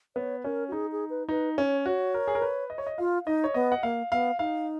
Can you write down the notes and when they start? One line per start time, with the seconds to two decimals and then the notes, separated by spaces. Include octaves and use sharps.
0.16 B3 C#5
0.44 C#4 A#4
0.68 F#4
0.72 D#4 G#4
0.92 G#4
1.10 B4
1.29 D#4 B4
1.57 C#4 C#5
1.85 F#4 C#5
2.14 A#4
2.28 G#4
2.35 A#4
2.42 B4
2.70 D#5
2.78 C#5
2.87 D#5
2.98 F4 F5
3.26 D#4 D#5
3.44 C#5
3.54 B3 D#5
3.72 F#5
3.83 A#3 F5
4.12 B3 F5
4.39 D#4 F5